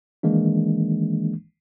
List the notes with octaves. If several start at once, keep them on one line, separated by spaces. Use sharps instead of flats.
D#3 E3 G#3 A#3 D4